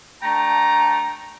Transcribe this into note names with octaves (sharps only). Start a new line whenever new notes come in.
A3 D4 G5 A#5